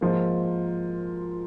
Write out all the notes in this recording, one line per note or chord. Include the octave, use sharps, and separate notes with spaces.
G#2 F3 A#3